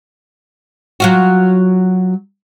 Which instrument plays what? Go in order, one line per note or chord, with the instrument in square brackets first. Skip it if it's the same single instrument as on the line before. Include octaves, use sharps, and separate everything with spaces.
[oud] F#3 F4 F#4